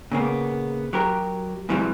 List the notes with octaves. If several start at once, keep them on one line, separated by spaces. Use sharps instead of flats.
A#2 C#3 A#3 B3
F#3 G4 A#4
G#2 C3 E3 F#3 G3